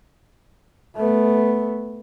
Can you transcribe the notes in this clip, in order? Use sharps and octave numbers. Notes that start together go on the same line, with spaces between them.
A3 B3